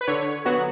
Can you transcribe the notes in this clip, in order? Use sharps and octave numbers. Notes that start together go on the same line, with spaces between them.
B4
D3 C#5
F#3 B3 F#4